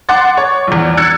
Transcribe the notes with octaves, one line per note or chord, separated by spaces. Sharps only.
F#5 C6 D6 A6
C#5
A#1 E2
E6 F#6 G#6 A6 C#7